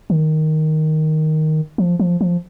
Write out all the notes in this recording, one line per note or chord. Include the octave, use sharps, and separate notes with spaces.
D#3
F3
F3
F3